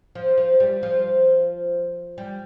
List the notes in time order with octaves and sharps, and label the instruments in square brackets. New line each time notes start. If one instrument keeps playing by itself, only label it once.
[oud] F3
F3
G3
F3
G3